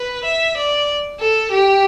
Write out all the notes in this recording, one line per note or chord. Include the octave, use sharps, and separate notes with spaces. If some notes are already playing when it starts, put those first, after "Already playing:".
Already playing: B4
E5
D5
A4
G4